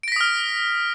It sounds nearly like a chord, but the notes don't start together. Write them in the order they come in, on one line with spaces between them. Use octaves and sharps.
D7 A#6 B6 D#6 F6